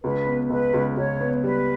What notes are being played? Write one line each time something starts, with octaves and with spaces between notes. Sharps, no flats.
C#2 B4
B3
C#2 B4
C#2
C#2 C#5
B3
G3 B4